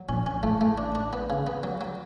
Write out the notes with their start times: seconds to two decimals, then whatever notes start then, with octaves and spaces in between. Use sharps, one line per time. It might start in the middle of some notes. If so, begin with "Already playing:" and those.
Already playing: F#3
0.09 A#1 A#2 C#4
0.26 C#4
0.43 A1 A2 A3
0.61 A3
0.78 D4
0.95 D4
1.13 B3
1.30 C#3
1.47 B3
1.63 F#3
1.81 F#3